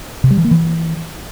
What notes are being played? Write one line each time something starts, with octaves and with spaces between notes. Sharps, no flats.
C3
G3
E3
A#3
E3